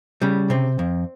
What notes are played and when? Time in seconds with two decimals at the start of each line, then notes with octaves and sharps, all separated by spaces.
0.22 C#3 G3
0.50 C3 C4
0.79 F2